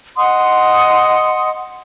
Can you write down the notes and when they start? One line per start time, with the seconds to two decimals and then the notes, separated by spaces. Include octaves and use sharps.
0.17 D#5 F#5 C6 D#6